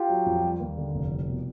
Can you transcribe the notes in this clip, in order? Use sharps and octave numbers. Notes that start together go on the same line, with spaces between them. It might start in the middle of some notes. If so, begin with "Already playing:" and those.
Already playing: F4 G4
F#3
F2
G3
D#2
D3
F1
C2
B2